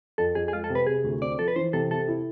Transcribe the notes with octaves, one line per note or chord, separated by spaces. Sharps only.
F2 A4
F2 G#4
G#4
G#3 F4
A4
C3
B4
C3 G#4
D2
C4 D5
F3 A4
B4
E3 C5
C3 A4
C3 A4
E4